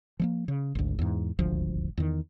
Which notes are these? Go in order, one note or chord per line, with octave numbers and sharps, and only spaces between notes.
F3 G#3 A#3
C#3
G#1 D2
E2 G#2
D#1 G#1 D2 F3
E2 D#3